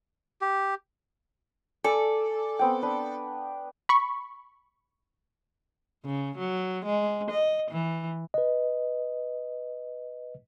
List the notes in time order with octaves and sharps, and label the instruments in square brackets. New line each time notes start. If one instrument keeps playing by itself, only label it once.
[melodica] G4
[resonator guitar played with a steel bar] A4 [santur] D5 G#5
[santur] B3 C4 G5
D4 B4
[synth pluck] B5 C#6
[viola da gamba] C#3
F#3
G#3
D#5
E3
[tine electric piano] B4 D#5